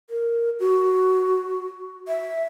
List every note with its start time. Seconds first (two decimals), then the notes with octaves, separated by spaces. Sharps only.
0.10 A#4
0.60 F#4
2.08 E5